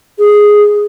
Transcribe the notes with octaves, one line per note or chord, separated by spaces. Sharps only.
G#4